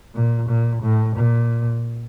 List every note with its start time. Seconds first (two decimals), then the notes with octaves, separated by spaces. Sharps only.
0.15 A#2
0.49 A#2
0.83 A2
1.16 A#2